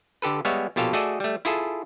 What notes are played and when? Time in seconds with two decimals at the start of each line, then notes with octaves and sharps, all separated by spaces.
0.22 D3 G4 A4 B4
0.45 G3 G#3 B3 C#5 E5 F5
0.76 A#1 B2 F4 G4 A4 F5
0.93 A3 F#4 G#4 A4 D5 D#5
1.20 G3 A3
1.45 E4 F4 G#4 A4